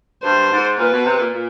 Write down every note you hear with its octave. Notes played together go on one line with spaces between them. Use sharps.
G2 C5
G#2
A#2 B4
B2
C3
A#2
A#2